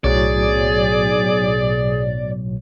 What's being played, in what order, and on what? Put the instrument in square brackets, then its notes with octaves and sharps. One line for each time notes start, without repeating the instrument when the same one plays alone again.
[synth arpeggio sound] B1 [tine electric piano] A2 F#3 C#5 [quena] G#4 [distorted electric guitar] D5